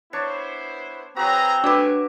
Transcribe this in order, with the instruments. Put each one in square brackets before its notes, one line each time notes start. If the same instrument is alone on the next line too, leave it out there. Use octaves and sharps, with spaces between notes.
[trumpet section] B3 E4 C5 [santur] D4 C#5 C#6
[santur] F#3 F#4 [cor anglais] C4 [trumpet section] G#4 B4 A#5
[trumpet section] G3 A3 G#5 [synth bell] D4 F#4 B4 [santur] E5 D6